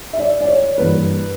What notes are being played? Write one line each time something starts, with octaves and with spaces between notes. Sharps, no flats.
E5
D5
D5
C#5
G2 E3 A#3 B4